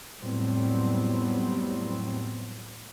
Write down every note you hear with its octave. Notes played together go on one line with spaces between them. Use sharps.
F2 A2 F#3 G3 B3 C4